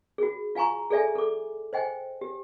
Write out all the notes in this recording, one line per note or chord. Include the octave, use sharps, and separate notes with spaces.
F#4 G#4
F4 F5 G#5 A#5 C#6
G#4 A4 D5 E5 G#5
A4 D6
C5 D#5 G5 G#5
G4